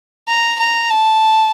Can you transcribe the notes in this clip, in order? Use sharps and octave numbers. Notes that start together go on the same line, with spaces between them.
A#5
A#5
A5